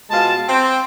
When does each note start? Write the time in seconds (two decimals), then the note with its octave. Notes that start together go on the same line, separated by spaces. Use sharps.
0.10 B2 G#3 F4 G#4 A5
0.47 C4